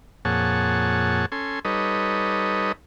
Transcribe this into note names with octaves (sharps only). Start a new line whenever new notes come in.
F2 A#2 G#4 C#5 F#5 A5
C#4 A4 G#5 C6
G3 D#4 A4 B4 C#5 D#5